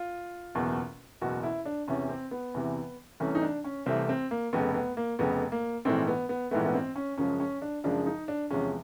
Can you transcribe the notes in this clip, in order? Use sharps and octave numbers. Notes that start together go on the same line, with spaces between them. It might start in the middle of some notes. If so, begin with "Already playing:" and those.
Already playing: F4
F#1 E2 B2
F#1 E2 B2 F#4
E4
D4
E2 C3 E3 C#4
C4
B3
E2 C3 E3
C2 C3 E3 A3 C#4
D#4
D4
C#4
C2 C3 E3 A3 C4
C4
A#3
F1 F2 C#3 B3
B3
A#3
F1 F2 C#3 B3
A#3
A#1 G#2 E3 A3 C4
B3
B3
A#1 G#2 E3 A3 B3
B3
C4
C#4
F#2 C#3 F3 G#3 C#4
C#4
D4
F#2 C#3 F3 G#3 D4
D#4
D4
E2 C3 F3 G#3 C#4